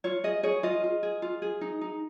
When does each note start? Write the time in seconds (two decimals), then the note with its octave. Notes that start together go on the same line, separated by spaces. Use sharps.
0.04 F4 C#5
0.24 G#4 D#5
0.43 G#4 C#5
0.63 F4 D#5
0.84 F4
1.03 G#4
1.22 F4
1.42 G#4
1.61 D#4
1.81 D#4